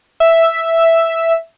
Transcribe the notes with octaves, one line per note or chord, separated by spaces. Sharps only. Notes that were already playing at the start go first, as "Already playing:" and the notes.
E5